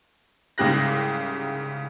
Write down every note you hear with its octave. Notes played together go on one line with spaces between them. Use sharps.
C2 G#2 C#3 G4 F#6 A#6